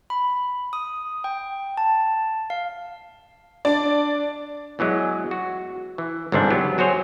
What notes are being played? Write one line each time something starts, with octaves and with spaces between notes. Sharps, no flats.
B5
D#6
G5
A5
F5
D4 D5
E2 E3 F#3 G#3
F#4
E3
G1 C#2 G#2 C3 E3 D4
F#3 B3 G4
F#3 F#4 G#4 C5 C#5